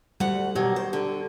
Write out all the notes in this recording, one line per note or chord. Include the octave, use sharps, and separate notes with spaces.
D2 G3 F#5
B2 D#3 F#3 G4
C5
D3